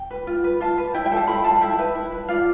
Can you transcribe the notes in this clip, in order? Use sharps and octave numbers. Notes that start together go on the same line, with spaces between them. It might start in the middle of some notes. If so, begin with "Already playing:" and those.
Already playing: G5
B4
F4
B4
F4 F5 A5
B4
E4 E5 G5
E5 G5
A4
F5 A5
E4 G5 B5
A4 F5 A5
E4 E5 G5
B4
E4
B4
F4 D5 F5